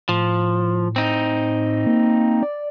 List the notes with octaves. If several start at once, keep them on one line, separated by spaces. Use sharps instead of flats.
A2 F3
C4 D#4
A#3
D5